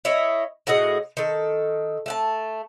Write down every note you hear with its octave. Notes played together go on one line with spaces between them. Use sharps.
E4 C#5 D#5 E5
A2 F#4 G#4 D#5
D#3 A4
A3 F#5 A5